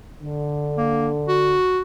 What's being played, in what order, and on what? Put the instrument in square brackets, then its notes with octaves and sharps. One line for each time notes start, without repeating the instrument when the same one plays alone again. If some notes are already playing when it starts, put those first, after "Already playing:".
[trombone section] D3
[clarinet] A#3
F#4